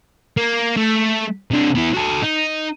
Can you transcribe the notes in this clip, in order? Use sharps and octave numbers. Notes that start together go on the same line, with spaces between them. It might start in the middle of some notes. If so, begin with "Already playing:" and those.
A#3
A3
C3 D4
B3 E4
F#4 A4
D#4